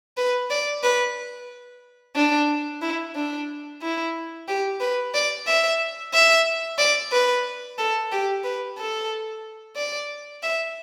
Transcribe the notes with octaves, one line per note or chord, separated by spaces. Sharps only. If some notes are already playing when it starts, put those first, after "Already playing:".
B4
D5
B4
D4
E4
D4
E4
G4
B4
D5
E5
E5
D5
B4
A4
G4
B4
A4
D5
E5